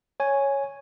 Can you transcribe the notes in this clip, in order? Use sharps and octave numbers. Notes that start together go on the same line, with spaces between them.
C#5 G#5